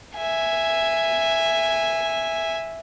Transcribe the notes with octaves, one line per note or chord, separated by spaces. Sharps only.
E5 G#5